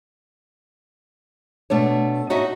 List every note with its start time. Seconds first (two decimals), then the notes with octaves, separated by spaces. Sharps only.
1.70 B2 A3 D4 C#5
2.30 D#4 F#4 C#5 D#5 E5